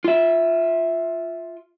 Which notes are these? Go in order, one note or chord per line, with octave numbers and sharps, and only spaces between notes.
F4 E5